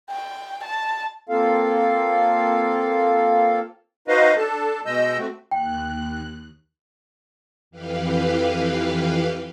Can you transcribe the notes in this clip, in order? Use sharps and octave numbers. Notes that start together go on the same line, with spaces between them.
G5
A5
A#3 C4 F4 A4 F5
D#4 F#4 B4 C5 D#5 F5
D4 A4 A5
B2 G#3 D#5 E6 G6
A3 C4 F#4
D#2 G5 F#6
F2 E3 G4 B4 F5